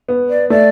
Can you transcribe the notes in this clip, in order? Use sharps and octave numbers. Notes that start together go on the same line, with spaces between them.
B3
D5
A3 D5